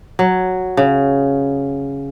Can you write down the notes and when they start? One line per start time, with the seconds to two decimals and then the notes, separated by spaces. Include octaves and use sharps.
0.19 F#3
0.77 C#3